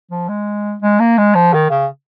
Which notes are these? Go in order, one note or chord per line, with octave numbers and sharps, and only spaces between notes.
F3
G#3
G#3
A#3
G#3
F3
D#3
C#3